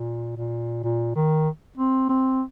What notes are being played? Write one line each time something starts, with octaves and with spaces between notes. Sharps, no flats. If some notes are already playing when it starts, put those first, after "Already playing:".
Already playing: A#2
A#2
A#2
D#3
C4
C4